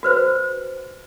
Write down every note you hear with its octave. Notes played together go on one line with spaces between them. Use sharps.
F#4 B4 C5